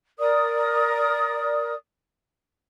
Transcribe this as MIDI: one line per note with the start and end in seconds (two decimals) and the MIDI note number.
0.19 1.73 70
0.19 1.73 74
0.19 1.73 87